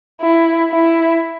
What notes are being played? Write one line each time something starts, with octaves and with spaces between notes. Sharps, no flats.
E4
E4